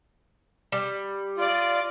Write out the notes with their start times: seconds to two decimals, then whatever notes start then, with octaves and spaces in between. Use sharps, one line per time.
0.72 G3
1.38 F4 D5 D#5